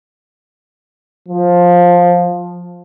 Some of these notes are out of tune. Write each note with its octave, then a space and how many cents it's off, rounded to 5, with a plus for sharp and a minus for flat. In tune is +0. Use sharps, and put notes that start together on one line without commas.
F3 +10